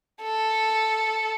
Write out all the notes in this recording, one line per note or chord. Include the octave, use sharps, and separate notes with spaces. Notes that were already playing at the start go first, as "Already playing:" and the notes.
A4